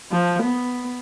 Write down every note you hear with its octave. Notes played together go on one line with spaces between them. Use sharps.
F3
B3